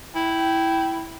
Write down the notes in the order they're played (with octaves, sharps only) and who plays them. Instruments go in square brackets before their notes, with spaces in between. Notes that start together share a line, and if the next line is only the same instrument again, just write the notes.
[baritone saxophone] E4 [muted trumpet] G5